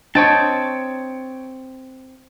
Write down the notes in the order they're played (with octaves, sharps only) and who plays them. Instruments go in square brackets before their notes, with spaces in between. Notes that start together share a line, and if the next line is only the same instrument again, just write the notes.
[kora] C4 D#5 [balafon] D4 [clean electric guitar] C#5 G5 A5